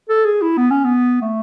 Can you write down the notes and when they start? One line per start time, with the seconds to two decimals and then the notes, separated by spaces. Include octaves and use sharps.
0.09 A4
0.25 G#4
0.42 E4
0.57 B3
0.70 C#4
0.84 B3
1.22 A3